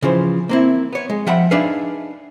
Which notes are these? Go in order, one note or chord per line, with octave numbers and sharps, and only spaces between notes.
C#3 E3 F3 C5
A#3 C4 E4
B3 C#5
G#3
F3 E5 F#5 G5 B5
D4 D#4 G#4 B4 E5 F5